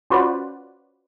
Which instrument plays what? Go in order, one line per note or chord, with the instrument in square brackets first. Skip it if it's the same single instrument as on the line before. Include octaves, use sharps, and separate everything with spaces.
[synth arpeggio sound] C#4 F4 F#4 B4 C5 D5